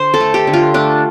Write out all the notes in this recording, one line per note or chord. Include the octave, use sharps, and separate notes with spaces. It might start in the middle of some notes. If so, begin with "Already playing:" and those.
Already playing: D3 C5
A4
A3
G4
D3
F4
A3 D4